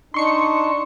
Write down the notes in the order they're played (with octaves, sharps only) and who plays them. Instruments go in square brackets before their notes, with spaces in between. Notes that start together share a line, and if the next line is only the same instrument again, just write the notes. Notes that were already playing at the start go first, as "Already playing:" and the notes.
[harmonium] D4 D#4 [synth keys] C6 C#6 C#7